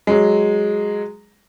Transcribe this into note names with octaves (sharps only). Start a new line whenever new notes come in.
F#3 G#3